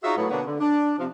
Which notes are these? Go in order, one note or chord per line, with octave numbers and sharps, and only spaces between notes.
D#4 F4 F#4 G#4 C#5 E5
A2 F#3 B3
B2 D3 A#3 B3 D4 C#5
D3
D4
C3 F3